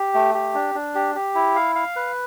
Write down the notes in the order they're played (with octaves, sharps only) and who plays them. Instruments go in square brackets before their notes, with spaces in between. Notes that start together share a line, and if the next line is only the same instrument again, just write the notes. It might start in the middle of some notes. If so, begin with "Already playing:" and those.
Already playing: [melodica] G4
A3
G4
D4
D4
G4
G4
E4
F5
F5
B4